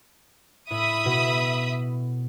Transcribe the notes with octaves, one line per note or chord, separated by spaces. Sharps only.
A2 E5 B5 D#6
B2